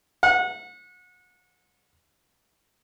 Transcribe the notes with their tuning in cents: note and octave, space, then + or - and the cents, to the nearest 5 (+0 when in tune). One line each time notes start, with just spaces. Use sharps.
F#5 -30